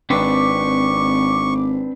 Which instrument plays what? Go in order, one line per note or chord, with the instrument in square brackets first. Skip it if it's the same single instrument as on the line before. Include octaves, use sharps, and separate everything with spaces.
[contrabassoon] G#1 [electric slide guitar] C4 D4 B4 [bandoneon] C#6 [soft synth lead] D6